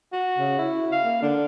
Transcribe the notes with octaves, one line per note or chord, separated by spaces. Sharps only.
F#4
C#3
E4
F5
A#3
D3 D4